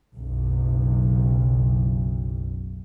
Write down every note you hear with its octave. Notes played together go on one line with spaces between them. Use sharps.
F#1 B1